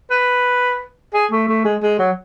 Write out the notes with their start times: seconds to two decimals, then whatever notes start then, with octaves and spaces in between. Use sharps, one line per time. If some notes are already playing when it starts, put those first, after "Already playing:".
0.10 B4
1.14 G#4
1.31 A3
1.48 A3
1.64 G#3
1.82 G#3
1.99 F#3